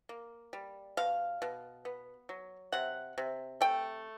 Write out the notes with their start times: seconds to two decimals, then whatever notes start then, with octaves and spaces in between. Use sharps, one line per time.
0.09 A#3
0.53 G3
0.97 B2 F5
1.42 B2
1.85 B3
2.29 F#3
2.72 C3 F#5
3.18 C3
3.61 A3 G5